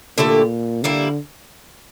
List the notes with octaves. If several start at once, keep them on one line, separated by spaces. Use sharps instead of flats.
A#2 D3 A3 E4 G4
D3 G3 A#3 E4